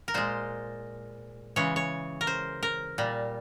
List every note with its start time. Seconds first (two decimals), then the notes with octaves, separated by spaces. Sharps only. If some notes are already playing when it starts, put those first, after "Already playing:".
0.08 A#4
0.14 A#2 G#3 C5
1.56 C#3 E3 G#3 C#5
1.76 C#5
2.21 A#4
2.27 C5
2.63 A#4
2.98 A#2 G3